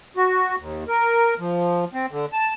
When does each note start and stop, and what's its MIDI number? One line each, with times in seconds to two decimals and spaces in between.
0.17 0.56 66
0.59 0.84 39
0.88 1.34 70
1.39 1.85 53
1.94 2.06 60
2.11 2.26 50
2.33 2.54 81